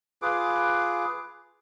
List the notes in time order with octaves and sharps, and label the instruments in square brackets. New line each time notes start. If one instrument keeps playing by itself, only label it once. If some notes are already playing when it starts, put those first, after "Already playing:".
[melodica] F4 G#4 B4 D6